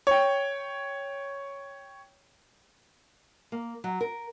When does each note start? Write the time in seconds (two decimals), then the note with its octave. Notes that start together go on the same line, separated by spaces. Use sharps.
0.07 C#5 G5
3.52 A#3
3.84 F#3
4.01 A#4